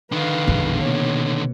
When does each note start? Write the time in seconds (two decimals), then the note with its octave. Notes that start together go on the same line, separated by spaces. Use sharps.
0.12 D3 D#3 B4 F5
0.48 A#1 F2 B2 G#3
0.82 C3 A#3 B3 C#5